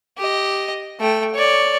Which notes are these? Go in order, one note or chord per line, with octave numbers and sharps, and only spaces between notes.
G4 D#5
A3 G5
C#5 D5